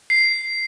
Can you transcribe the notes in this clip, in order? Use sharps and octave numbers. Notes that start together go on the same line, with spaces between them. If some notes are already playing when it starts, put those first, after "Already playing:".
C7